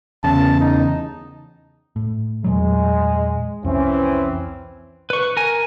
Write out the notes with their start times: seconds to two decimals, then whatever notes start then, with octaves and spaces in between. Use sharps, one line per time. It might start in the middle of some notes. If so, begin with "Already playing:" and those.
0.24 E2 C#3 A5
0.61 D#4
1.96 A2
2.44 E2 A#2 F#3 G#3
3.64 C2 F2 E3 C4 C#4
5.10 B4 C#6
5.37 A#4 G#5